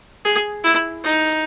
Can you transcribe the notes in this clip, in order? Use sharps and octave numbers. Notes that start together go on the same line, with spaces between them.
G#4
E4
D#4